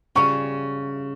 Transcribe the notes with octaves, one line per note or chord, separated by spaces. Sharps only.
C#3 G3 C#4 F4 C#6